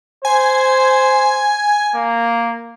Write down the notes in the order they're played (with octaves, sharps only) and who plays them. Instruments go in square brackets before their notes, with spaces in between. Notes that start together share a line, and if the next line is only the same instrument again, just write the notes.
[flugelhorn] C5 [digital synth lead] G#5
[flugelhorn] A#3